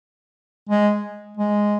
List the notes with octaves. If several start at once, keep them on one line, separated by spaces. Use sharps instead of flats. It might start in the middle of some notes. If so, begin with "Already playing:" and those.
G#3
G#3